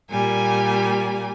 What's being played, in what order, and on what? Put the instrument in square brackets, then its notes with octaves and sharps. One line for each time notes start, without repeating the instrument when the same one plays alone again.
[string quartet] A#2 G3 A#3 G#5